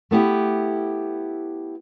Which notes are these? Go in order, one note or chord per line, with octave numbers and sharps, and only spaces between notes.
A3 B3 E4 G4